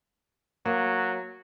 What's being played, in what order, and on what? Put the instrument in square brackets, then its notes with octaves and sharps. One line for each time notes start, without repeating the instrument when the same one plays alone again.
[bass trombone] F#3 [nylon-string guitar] A#3